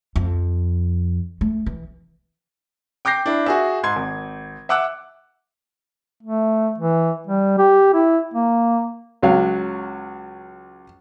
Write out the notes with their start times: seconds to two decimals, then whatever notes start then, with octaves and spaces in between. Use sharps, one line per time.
0.16 F2
1.41 A3
1.66 E3
3.05 G5 D6 G6 A#6 C7
3.26 D4 E4
3.46 F#4 G#4 E5
3.83 G#2 C6 G#6
3.96 G#1
4.69 E5 F#5 D6 E6 F#6
6.23 A3
6.78 E3
7.27 G3
7.58 G4
7.94 E4
8.34 A#3
9.22 C#2 F#3 F5